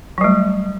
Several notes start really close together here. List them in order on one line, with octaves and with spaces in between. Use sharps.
F#3 G3 A3